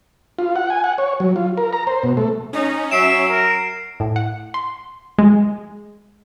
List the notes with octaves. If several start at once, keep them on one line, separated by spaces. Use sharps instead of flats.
F4
F#5
G#5
F#5
C#5
F#3
F4
A#4
A#5
C5
B2
A3
C#4 D#4
F#3 E5 C7 D7 E7
A#4
A2
F#5
C6
G#3